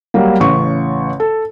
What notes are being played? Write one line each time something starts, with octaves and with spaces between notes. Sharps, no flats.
F#3 G3 A#3
A1 C#3 C#6
A4